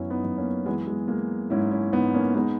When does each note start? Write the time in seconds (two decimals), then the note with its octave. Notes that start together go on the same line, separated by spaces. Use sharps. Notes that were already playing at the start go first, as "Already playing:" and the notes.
Already playing: F#2 F#3 B3 C#4 E4
0.10 B3 D#4
0.24 F#2
0.37 A#3 C#4
0.66 E3 G#3 B3
0.87 G#3
1.08 G#3 A#3
1.50 G#2 C#4 E4
1.71 C#4 E4
1.92 G#2 B3 D#4
2.14 A#3 C#4
2.35 G#3 B3 D#4